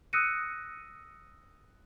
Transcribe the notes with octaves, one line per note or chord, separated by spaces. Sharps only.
D#6 E6 F#6 A#6 C#7 D#7